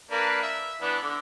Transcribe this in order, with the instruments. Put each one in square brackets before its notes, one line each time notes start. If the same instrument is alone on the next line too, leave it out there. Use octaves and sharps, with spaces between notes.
[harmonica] A#3 D4 B4
E5
E3 B3 D4
D3